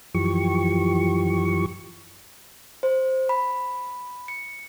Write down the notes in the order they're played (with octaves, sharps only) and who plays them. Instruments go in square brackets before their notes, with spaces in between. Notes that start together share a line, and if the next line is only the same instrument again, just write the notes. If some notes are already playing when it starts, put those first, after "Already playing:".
[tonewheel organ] F#2 E3 F3 G4 C#6
[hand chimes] C5
B5
C#7